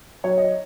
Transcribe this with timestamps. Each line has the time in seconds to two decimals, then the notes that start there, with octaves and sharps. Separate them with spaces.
0.24 F#3 C#5
0.38 D#5